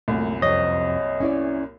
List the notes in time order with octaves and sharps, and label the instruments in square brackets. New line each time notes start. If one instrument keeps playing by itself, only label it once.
[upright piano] C2 F#2 A#2 [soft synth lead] A3
[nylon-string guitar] F2 C3 [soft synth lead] C#5 [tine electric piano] D#5
[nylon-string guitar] C#4 E4 D5